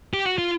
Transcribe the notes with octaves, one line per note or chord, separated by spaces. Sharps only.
G4
F#4
F4